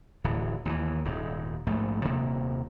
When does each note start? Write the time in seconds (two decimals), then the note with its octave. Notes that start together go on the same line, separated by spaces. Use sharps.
0.24 D1 A2 E3
0.65 D#2 C#3 E3
1.05 D#1 G#2
1.67 A#1 G#2 A3
2.05 D#1 C3 A#3